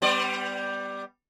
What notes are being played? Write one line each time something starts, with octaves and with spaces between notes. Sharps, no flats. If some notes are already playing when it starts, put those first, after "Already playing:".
G3 B3 D5